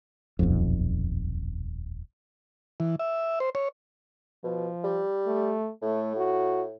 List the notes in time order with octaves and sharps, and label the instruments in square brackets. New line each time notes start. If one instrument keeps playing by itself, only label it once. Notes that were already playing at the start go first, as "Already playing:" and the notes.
[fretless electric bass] D#1 B1 F2
[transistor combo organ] E3
E5
C5
C#5
[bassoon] B2 [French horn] F3
[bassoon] G3
[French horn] A3
[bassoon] A2 [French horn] A3
[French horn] F#4